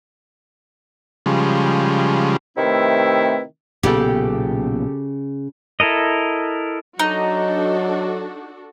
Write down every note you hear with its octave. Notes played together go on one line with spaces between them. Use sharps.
C#3 F3 G3 G#3
C3 D#3 A3 C4 E4 B4
B1 A#2 C#3 B3 G4 A4
E4 A4 A#4 D#5
F#3 D4 D#4 F#4 A4 D#5